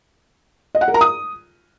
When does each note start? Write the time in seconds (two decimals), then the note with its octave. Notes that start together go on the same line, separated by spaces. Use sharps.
0.75 D#5
0.81 F#5
0.88 A#4
0.94 A#5
1.01 D#6